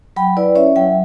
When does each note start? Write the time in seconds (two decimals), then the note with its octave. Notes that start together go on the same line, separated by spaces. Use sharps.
0.16 F#3 G5 B5
0.37 E4 B4 D5
0.56 C#4 C#5 E5
0.76 F#3 E5 G5